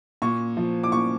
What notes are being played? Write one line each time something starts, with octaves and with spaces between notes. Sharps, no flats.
A#2 C#6
F3
D6
A#2 C#6